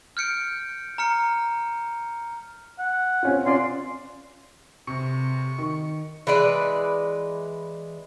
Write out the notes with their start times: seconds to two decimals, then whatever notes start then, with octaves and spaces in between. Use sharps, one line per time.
0.17 F6 G6 C#7 D7
0.98 A#5 F6 C#7
2.79 F#5
3.23 C4 C#4 F4
3.46 C#4 F4 D5 C6
4.87 C3 C#6
5.58 D#3
6.27 E3 G#3 B4 D5